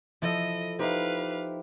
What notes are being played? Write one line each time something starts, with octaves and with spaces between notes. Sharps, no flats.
F3 E4 A4 D#5 E5
D#4 E4 G4 B4 C5 F5